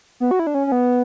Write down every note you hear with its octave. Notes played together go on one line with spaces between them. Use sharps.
B3
F#4
E4
D4
C#4
C#4
B3